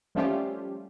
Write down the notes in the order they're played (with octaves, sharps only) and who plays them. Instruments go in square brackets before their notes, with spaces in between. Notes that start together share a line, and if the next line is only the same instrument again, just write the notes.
[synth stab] F3 G3 A3 C#4 F4 G4